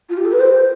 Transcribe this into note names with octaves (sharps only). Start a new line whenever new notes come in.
F4
G4
A4
B4
C5